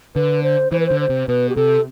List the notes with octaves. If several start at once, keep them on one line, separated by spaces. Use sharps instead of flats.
D3 B4
C5
E3 C5
B4
D3 C5
C5
C3
B2 B4
G4
C3 A4